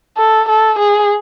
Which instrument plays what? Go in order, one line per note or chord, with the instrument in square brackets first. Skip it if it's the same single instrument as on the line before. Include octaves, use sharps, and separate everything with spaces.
[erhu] A4
A4
G#4